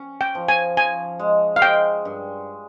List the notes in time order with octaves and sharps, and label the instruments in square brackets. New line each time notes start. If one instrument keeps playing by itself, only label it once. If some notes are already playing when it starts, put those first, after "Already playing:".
Already playing: [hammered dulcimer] C#4
[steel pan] G5
[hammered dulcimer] F3
[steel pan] G#5
[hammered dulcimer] F3 [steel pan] G#5
[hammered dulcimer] G#3
[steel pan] F5
[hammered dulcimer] G#3 [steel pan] G5
[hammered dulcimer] G2